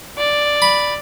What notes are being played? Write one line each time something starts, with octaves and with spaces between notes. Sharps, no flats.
D5
B5